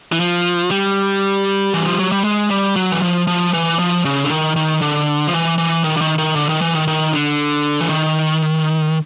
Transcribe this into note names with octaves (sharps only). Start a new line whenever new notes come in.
E3
F3
G3
E3
F3
F#3
G3
G#3
G3
F#3
E3
F3
F3
E3
F3
C#3
D3
D#3
D#3
D3
F3
E3
E3
D#3
D3
D#3
D#3
D3
D#3
E3
D#3
D#3
D3
E3
D#3